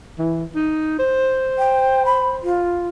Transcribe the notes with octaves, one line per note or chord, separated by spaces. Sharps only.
E3
D#4
C5
G5
B5
F4